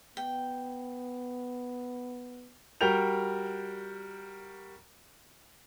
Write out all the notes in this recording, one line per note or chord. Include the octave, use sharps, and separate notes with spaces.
B3 G5
G3 F#4 A#4 G5 G6 F7